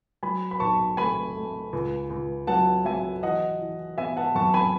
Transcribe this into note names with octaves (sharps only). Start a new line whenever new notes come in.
F#3 G#5 B5
B5
B1 A5 C#6
A3 G#5 B5
A3
C#2
C#2
F#3 F#5 A5
F#3 E5 G#5
E3 D#5 F#5
E3
B3 E5 G#5
F#5 A5
F#2 A5 C#6
G#5 B5